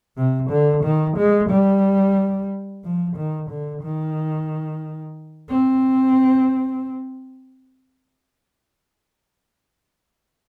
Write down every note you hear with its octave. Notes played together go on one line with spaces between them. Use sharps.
C3
D3
D#3
G#3
G3
F3
D#3
D3
D#3
C4